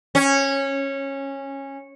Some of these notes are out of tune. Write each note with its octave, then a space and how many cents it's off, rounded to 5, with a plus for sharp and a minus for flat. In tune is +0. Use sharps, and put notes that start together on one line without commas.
C#4 -15